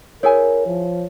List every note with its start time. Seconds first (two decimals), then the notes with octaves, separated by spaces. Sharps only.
0.23 E4 G#4 A#4 C#5 G#5
0.67 F3